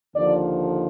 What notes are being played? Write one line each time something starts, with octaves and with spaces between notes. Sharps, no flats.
D#2 D3 F3 D5